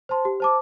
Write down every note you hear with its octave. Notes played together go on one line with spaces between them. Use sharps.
C5 A5 C6
G4
C5 A5 D6